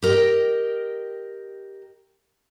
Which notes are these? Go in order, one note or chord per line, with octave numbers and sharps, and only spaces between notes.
G4 A#4 C#5 D#5 G5